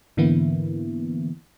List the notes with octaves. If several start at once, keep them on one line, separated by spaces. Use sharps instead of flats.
G#2 D3 E3 A#3 B3 E4